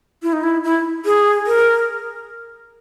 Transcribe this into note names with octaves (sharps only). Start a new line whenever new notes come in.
E4
D#4
E4
E4
G#4
A#4